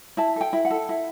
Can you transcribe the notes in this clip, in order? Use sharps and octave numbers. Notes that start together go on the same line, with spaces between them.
E4 A5
A4 G5
E4
F#5
A4
E4